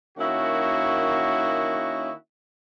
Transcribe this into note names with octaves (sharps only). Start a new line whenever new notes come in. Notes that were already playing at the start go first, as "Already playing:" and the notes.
D#3 A#3 C#4 E4 F#4